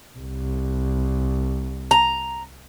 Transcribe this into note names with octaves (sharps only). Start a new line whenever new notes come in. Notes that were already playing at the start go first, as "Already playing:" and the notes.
C2
A#5